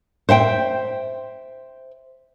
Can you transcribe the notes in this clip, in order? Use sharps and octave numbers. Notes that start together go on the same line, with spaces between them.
C5 E5 F#5 G5